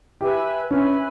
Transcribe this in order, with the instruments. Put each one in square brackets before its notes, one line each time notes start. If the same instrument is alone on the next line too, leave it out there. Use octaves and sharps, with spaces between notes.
[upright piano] G4 [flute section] B4 E5 G#5
[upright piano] C#4 [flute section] B4 E5 G#5